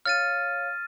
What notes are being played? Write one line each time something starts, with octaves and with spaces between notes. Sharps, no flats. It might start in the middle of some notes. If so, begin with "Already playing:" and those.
C#5 F5 F6 A6 D#7